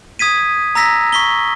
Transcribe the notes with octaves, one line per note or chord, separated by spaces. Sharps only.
D#6 G#6 B6 D#7
A#5 E6 A#6 B6
C#6 B6 G7